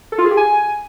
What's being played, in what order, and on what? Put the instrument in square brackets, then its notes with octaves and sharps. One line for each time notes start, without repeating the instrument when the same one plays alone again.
[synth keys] A4
F4
G#4
G4
G#5